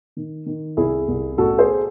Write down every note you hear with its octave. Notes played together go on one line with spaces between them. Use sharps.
D#3
D#3
C2 E4 G#4
C2
A1 F#4 A4
G#4 C5